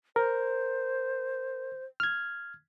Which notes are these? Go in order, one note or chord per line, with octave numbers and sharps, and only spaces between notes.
A#4 C5
F6 G#6